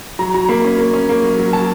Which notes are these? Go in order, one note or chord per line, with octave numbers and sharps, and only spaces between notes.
F#3 A#5
F#3 A#5
A#3 B5
C#4
A#3
C#4
A#3
F#3
F#3
F#3 A5